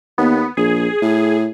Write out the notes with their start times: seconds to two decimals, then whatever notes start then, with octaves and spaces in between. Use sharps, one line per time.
0.18 D#2 B3
0.57 A#1 G#4
1.02 A2